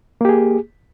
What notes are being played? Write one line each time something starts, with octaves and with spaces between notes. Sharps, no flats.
A#3 G4 G#4